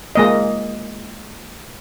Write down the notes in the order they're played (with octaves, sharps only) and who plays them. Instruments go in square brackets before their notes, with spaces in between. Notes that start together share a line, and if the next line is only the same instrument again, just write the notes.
[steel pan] G#3 A#3 D#5